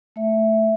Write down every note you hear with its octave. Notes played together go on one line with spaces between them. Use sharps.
A3 E5